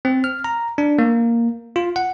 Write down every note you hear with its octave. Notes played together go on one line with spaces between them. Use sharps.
C4
F6
A#5
D4
A#3
F4
F#5